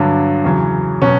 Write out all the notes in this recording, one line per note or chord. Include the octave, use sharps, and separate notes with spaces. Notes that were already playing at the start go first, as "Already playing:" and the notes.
Already playing: G2 D3 F#3
E2 C#3 F#3
B2 F#3 C#4